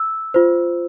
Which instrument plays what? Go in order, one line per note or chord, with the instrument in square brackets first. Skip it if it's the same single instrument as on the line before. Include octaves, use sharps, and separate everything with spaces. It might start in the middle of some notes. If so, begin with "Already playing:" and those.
Already playing: [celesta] E6
F4 C5